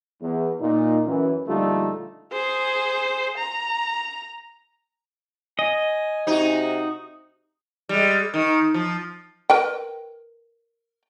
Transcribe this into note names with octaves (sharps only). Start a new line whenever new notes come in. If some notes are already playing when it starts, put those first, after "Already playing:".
E2
A#2 D#4
F#2 E3
A#1 D3 G3 A3 D#4 F4
G#4 C5
A#5
D#5 G#5
C3 D#4 F#4
G3 G#3
D#3
F3
A#4 B4 G5